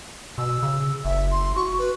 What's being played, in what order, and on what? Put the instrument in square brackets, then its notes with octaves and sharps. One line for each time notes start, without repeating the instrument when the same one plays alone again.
[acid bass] B2 [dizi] E6
[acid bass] C#3
[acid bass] F#1 [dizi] E5
[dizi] C6
[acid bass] F#4 [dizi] C#6
[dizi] B4